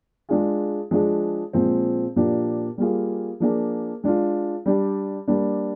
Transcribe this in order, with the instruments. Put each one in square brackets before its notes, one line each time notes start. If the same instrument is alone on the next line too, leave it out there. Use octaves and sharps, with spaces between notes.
[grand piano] G#3 D4 F4 G#4
F3 G#3 D4 G#4
A#2 F3 G#3 C4
A#2 F3 A#3 D4 G4
G3 A#3 F4 G#4
F3 A#3 D4 F4 G#4
G#3 D4 F4
G3 D4 G4
G3 A#3 D4